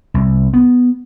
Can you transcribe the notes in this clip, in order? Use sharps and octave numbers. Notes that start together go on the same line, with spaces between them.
C2
B3